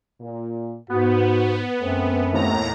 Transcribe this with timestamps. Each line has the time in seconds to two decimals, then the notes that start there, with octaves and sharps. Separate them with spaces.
0.20 A#2
0.90 G#2 B3 F#4
1.80 F#2 A3 C4
2.32 D#2 A2 A#5